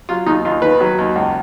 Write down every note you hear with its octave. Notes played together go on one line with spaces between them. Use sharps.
F#3 F4
D#2 D#4
D#2 F4
D#3 B4
F#3
D#2
C#2